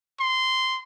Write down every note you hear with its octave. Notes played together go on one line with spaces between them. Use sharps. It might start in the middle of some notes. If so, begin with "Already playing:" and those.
C6